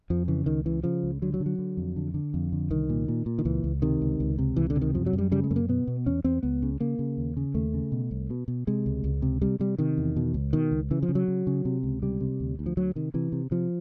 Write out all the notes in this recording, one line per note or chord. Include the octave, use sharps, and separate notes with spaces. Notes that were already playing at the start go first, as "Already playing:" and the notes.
F2 F3
C#3 E3
C#2 D#3
C#3 E3
C#3 F3
C#2
D3 F#3
F#3
D3
F#3
D3
F2
D3
D3
F2
D3
C2 D#3
A#2
A#2
A#2
D#3
C#2 E3
C#2
C3 D#3
C#2
C#2
C3
C#2 E3
D3
C3
D#3
F#2 F3
F#3
F#2
G3
C#3 G3
G#3
F#2 A3
A#3
B2 B3
B2
E2 C#4
E2 C4
C#2 B3
C#3
C#3 A#3
C#3
D#2
C#3
D#2 A3
C#3
B2
C2
B2
B2
C3 G#3
C#2
C#2
C3
C3 G3
C3 G3
C3 D#3
E2
B2
C#2
B2 D#3
C#2
C#3 E3
F3
C#3
F#3
C#3
C#3
C3
C#2
C3 G3
C3
D2
D2
F3
D2 F#3
C3 D#3
C3 E3
C3
C3 F3